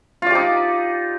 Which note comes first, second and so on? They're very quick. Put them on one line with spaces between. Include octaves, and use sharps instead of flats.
F4 D5 G4 D#4